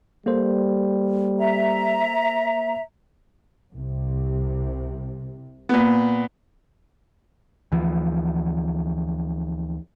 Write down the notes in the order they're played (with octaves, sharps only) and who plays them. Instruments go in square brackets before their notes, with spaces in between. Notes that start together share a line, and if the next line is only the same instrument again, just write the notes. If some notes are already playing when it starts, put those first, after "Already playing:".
[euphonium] G3 [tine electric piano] A#3 A4 C5
[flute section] E5 A#5
[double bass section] C2 C3
[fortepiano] A#2 B3
[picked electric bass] D2 E3 F3